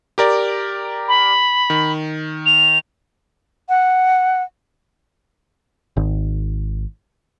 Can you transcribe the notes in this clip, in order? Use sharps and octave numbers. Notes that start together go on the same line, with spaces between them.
G4 A#4 D5
B5
D#3
F7
F#5
G#1